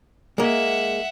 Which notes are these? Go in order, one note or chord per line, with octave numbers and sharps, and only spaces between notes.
G#3 A#3 E5 F#5